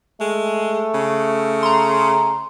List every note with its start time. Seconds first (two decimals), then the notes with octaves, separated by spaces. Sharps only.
0.20 G#3 A3
0.94 C#3
1.63 A#5 C6